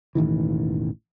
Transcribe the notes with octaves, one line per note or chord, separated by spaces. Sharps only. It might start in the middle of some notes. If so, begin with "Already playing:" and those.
E1 A1 D#3 E3